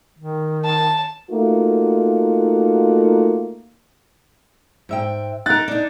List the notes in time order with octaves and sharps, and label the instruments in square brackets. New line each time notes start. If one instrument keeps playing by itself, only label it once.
[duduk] D#3
[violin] A5
[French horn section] A3 A#3 D#4 F4 F#4
[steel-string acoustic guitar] G#2 E5 G5
[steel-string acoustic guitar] D#4 A#4 [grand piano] F#6 A6
[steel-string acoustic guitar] D4 D#4